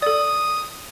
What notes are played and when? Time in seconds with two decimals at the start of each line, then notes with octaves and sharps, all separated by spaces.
0.02 A4 D5 D#6